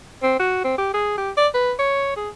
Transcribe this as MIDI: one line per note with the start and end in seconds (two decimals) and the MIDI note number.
0.23 0.36 60
0.39 0.63 66
0.64 0.76 60
0.78 0.89 67
0.94 1.17 68
1.18 1.31 67
1.37 1.48 74
1.54 1.72 71
1.79 2.15 73
2.17 2.29 68